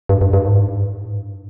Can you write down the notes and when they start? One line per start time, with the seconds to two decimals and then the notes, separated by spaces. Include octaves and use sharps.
0.09 G2
0.21 G2
0.33 G2
0.45 G#2
1.03 A2
1.10 G#2
1.18 G2